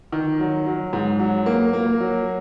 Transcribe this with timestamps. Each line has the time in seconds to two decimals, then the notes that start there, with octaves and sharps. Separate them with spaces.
0.12 D#3
0.40 F#3
0.66 F#3
0.93 G#2
1.19 F#3
1.46 A#3
1.73 A#3
2.00 F#3